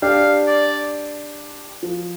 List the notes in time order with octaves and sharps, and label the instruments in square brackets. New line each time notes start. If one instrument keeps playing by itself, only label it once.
[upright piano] D4 G4 [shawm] F5
[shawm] D5
[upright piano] F3